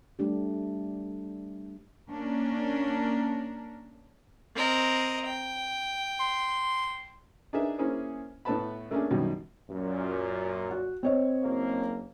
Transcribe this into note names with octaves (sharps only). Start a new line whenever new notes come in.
G3 A3 D4 G4
A#3 C#4 D4 A#4
C4 A#4 D#5
G5
C6
D4 D#4 G#4 A#4 B4 E5
A#3 C#4 E4 G#4 C5
A2 A3 B3 B4 A5 B5
A3 A#3 C#4 D4 G#4
F#2 B2 D#3 G3
F#2 A#2
F#4
C4 C#5 D#5
F#1 A#3